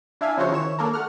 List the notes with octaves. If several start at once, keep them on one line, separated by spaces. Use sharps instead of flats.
D4 E4 E5 F5 G#5
C#3 F3 F#4 C5 C#5
D#3 E4 C#5 E7
A#3 D4 A4 A#4
A3 F#5 F6